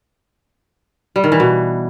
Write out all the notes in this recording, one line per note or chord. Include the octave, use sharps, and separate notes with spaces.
G3
D#3
E3
B2